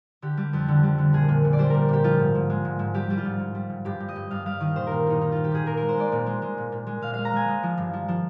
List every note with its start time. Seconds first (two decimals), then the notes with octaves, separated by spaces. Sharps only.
0.22 D3 G4
0.37 G3
0.53 F2
0.68 D3
0.83 G3
0.98 D3
1.13 A#2 G#4
1.28 A#2
1.44 A#2
1.53 D5
1.59 G3 C5
1.70 A#2 A#4
1.89 A#2 G4
2.04 F3 F4
2.19 G#2
2.35 G#2
2.50 G#3
2.65 G#2
2.79 G#2
2.94 G3 G4
3.10 G3
3.17 F4
3.25 G#2
3.39 G#2
3.55 G3
3.70 G#2
3.85 G2 G4
4.00 G2
4.09 D#5
4.16 G2
4.31 G2 F5
4.46 G3 F5
4.60 D#3 D#5
4.76 A#2 C5
4.87 A#2 A#4
5.07 A#2 D#4
5.21 A#2 D#4
5.32 A#2 F4
5.44 G4
5.51 A#2 G#4
5.66 A#2 A#4
5.77 G#3 A#4
5.89 C5
5.97 G#3 D5
6.12 A#2
6.26 G#3
6.42 G#3
6.58 A#2
6.72 A#2
6.87 G#3
7.02 A#2 F5
7.14 G#3 F5
7.25 A#5
7.33 G#3 G#5
7.48 G#3
7.63 F3
7.78 G2
7.93 F3
8.08 F3